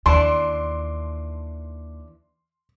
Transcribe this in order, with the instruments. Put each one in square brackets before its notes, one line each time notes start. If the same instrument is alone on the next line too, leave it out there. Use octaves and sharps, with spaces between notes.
[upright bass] D#2 [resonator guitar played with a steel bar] E3 D4 A5 [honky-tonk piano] C6